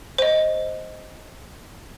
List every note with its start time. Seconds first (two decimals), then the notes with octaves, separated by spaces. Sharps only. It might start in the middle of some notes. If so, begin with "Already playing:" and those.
0.18 C5 D#5